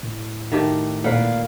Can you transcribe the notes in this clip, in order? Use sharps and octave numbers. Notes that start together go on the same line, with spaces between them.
A2
D#3 A3 G4
A#2 A#4 B4 F5 F#5